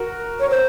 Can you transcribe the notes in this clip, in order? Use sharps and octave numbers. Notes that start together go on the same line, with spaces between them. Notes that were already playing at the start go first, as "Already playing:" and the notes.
Already playing: F#4 A#4
C#5
C5